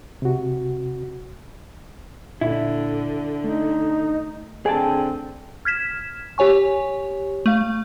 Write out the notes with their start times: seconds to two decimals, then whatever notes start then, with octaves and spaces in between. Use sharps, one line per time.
0.22 C3 F#4
2.41 A#2 D3 E4
3.44 A3 D#4
4.66 D3 C4 G#4 G5 A5
5.65 F6 G#6 B6 E7
6.38 G4 C#5 G#5 C#6
7.46 A3 F5